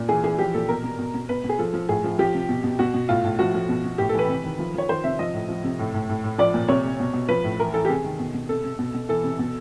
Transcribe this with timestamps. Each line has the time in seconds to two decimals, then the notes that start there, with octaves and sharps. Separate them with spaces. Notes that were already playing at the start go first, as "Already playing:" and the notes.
Already playing: A#2
0.09 E3 G#4
0.23 E3 G#4
0.39 F3 G4
0.54 A#2 A4
0.68 B2 A#4
0.84 B2
0.99 B2
1.14 B2
1.29 B2 B4
1.44 B2
1.49 G#4
1.59 F3 A4
1.73 F3
1.89 A2 G#4
2.04 F3
2.19 F3 G4
2.34 C3
2.49 B2
2.64 B2
2.79 B2 F#4
2.94 B2
3.09 A2 F4
3.24 A2
3.39 F3 F#4
3.54 F3
3.69 B2
3.84 B2
3.98 A2 G4
4.09 A4
4.14 E3
4.19 B4
4.29 C3
4.44 D#3
4.59 F3
4.74 F3 C#5
4.89 D#3 C5
5.03 C3 E5
5.19 F3 D#5
5.34 A2
5.49 F3
5.64 C3
5.79 A2
5.94 A2
6.09 A2
6.24 A2
6.38 F3 D5
6.54 A#2
6.68 C3 C#5
6.84 C3
7.00 B2
7.13 B2
7.28 F3 B4
7.44 A2
7.59 E3 A#4
7.74 E3 A4
7.85 G4
7.89 C3 G#4
8.04 D#3
8.19 B2
8.34 B2
8.49 C3 A4
8.64 C3
8.79 B2
8.94 B2
9.09 E3 A4
9.24 C3
9.39 B2